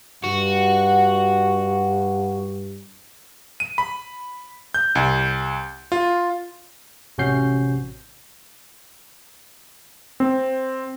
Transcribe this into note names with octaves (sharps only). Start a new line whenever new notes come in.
G2 F#4
D#7
B5
G6
C2
F4
A1 C3 C#4 F#4 G6 C7
C4